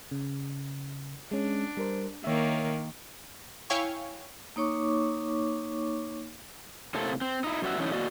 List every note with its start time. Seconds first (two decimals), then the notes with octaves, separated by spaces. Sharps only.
0.11 C#3
1.31 G#3 C#4 D4
1.77 G3 A#4 C5
2.24 D#3 A#3 C#5 E5
3.70 E4 C#5 F5 G5 G#5 C#6
4.56 A#3 D#4 C#5 C#6 D6
6.95 A2 C3 A3 A#3 C4 A4
7.21 C4
7.44 D#4 E4
7.62 F#2 B2 G3 F4 F#4 E5
7.78 E3 G3 A3 C#4 D#4 E4
7.92 A#3 F#4 D5 D#5